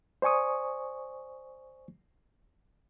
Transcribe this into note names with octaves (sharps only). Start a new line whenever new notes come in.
C5 D5 G#5 C#6 D#6